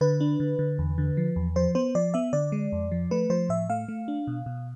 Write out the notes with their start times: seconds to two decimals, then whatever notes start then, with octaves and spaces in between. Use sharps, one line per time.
0.01 D3 B4
0.20 D4
0.40 D3
0.59 D3
0.79 E2
0.98 D3
1.17 F3
1.36 E2
1.56 F3 C5
1.75 B3 C5
1.95 F3 D5
2.14 B3 E5
2.33 D3 D5
2.52 G#3
2.72 F2
2.91 F3
3.11 A3 B4
3.30 F3 C5
3.49 A2 E5
3.70 A3 F5
3.88 A3
4.08 D4
4.27 B2
4.46 B2